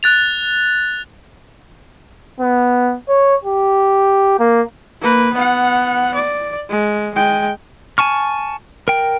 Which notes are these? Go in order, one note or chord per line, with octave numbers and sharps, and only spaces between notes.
F#6 A6 F7
B3
C#5
G4
A#3
A#3 B4
B3 F#5
D5
G#3
G#3 G5
G#5 A5 C#6 F6
A#4 G5